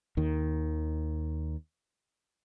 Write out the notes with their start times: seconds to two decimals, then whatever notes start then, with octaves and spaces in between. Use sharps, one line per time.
0.17 D#2 D#3